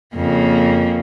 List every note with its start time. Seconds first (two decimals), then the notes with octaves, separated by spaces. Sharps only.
0.15 F2 C#3 A#3